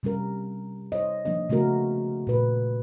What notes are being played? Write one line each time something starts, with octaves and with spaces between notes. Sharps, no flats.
C3 G3 C#4 A#4
C5 C#5 D#5
F3 A#3 D4 D#5
C#3 A3 B3 F#4 A#4
A#2 B4